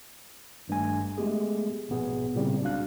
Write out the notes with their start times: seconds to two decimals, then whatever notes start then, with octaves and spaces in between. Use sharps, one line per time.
0.68 G#1 G2 A3 G#5
1.18 G#3 A3 B3 G4 G#4
1.89 A#1 G#2 B2 B3 G#4
2.35 A#2 C#3 G3 C4 E4
2.62 C#2 D4 F#4 F5 F#6